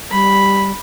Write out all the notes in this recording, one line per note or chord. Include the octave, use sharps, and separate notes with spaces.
G3 B5